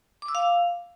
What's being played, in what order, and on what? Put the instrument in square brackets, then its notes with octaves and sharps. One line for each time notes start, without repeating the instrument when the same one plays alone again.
[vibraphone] D6
E6
F5